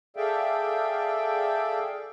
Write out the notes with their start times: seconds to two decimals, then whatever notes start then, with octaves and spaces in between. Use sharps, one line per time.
0.16 G#4 A4 D5 E5 F5 G5